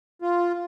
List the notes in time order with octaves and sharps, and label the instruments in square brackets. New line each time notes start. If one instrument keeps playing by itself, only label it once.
[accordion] F4